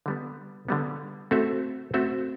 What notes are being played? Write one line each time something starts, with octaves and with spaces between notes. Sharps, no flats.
D3 G3 B3
D3 G3 B3
A3 C4 F#4 A4 E5
A3 C4 F#4 A4 E5